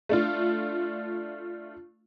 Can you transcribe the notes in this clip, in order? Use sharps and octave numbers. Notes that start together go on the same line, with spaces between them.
A3 D4 F4